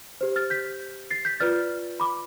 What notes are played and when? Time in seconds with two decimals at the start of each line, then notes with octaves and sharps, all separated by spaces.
0.21 G4 C5
0.36 F6 A6
0.50 G6 B6
1.11 A6 C7
1.25 G6 B6
1.40 F4 B4 D5 F6 A6
2.00 B5 D6